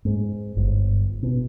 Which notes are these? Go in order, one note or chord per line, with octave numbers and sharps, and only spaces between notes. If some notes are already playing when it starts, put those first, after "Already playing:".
G#2
G1
B2